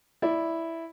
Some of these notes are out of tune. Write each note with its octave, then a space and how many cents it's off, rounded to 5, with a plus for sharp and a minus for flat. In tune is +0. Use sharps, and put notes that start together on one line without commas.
E4 +0 D5 +0